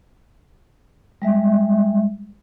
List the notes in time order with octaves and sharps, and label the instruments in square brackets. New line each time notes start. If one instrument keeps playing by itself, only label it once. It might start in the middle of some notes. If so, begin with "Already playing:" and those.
[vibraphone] G3 G#3 E5